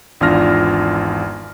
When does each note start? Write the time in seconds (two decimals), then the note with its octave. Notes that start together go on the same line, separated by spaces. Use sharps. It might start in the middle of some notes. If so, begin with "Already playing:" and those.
0.21 G#1 E2 D4 F4 F6 A#6